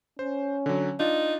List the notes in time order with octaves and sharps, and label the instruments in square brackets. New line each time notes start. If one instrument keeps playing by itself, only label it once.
[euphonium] C#4 [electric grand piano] C5
[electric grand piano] D3 F#3
[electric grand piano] D4 F4 [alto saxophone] D#4